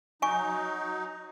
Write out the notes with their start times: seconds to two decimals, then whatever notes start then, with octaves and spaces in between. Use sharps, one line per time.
0.22 F#3 D#4 G#5 C#6